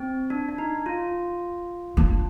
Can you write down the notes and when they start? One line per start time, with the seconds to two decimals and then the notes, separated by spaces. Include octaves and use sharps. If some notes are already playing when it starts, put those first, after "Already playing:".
Already playing: C4
0.30 D4
0.49 D4
0.58 D#4
0.86 F4
1.97 D4